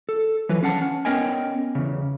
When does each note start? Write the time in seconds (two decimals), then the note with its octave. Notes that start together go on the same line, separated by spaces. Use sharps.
0.09 A4
0.49 E3 F#3 B4
0.63 C#4 F5 F#5 A5
0.81 C#4
1.05 B3 C#4 A#4 D#5 G5 G#5
1.75 E2 C#3